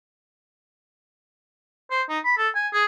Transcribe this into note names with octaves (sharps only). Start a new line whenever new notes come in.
C5
D#4
B5
A4
G#5
G#4